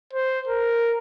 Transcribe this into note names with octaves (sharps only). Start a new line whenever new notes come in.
C5
A#4